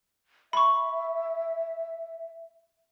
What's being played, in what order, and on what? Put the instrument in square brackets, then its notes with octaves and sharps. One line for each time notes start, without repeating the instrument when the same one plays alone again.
[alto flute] E5 [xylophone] B5 C#6